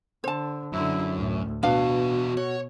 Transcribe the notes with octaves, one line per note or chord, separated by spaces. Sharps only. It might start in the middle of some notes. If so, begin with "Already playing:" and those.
D3 C5 A5
F#2 D3 E4
D2 A2
E2 B2 D4 F#4 B4 F5
F#4 C#5